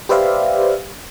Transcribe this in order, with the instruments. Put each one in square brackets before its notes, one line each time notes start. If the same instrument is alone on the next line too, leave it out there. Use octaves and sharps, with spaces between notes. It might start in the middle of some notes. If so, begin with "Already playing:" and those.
[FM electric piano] G4 B4 C5 D5 E5 F5